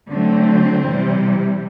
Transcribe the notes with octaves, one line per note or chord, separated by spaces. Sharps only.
D3 F#3 A3 C4
C3 E3 G3